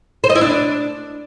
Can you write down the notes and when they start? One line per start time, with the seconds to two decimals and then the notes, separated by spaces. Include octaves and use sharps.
0.24 C5
0.30 D#5
0.35 E4
0.41 D4